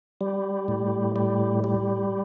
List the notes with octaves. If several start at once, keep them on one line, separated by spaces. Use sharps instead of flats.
G3
A2
G3
G3